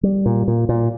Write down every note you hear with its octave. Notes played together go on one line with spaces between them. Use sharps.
G3
A#2
A#2
A#2